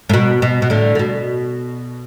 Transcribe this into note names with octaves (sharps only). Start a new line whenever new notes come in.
A2
B2
B2
B2
A2 D3
D3
B2